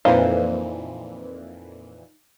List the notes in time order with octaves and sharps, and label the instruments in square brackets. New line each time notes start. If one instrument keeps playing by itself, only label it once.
[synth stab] F2 A#2 E3 [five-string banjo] D#4 C5 F5